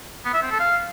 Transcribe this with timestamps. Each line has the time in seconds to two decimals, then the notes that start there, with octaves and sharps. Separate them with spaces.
0.25 B3
0.33 E5
0.42 C4
0.51 A4
0.59 F5